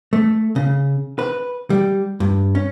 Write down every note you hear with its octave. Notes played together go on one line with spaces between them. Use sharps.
A3
C#3
B4
G3
G2
C#4